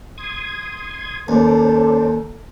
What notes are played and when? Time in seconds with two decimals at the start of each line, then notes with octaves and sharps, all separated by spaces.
0.18 C6 D#6 G#6
1.28 D#2 C#4 A4 C5 D5